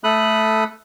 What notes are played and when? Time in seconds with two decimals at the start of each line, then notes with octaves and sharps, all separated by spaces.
0.04 A3 A4 B5 D#6 F#6